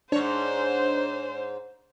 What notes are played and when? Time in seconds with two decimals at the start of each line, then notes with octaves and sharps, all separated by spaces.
0.12 G#2 D4 C5 C#5